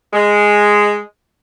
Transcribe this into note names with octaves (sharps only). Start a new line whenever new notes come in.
G#3